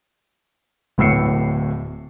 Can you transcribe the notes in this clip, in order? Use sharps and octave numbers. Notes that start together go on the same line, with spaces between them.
D1 A2 B3 E6 C7 C#7